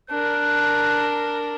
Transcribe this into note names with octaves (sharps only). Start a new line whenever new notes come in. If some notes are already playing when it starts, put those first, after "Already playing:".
D4 A#4 F#6